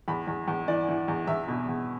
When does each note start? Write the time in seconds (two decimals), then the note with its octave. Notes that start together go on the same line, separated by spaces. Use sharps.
0.08 E2 B5
0.27 E2
0.48 E2
0.68 E3 D5
0.88 E3
1.08 E2
1.27 E2 E5
1.48 B2
1.69 E2